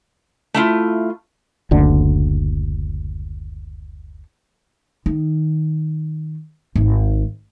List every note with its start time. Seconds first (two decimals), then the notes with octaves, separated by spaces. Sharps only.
0.54 A3 E4 F4
1.71 F#1 D2 D3
5.06 D#3
6.76 G#1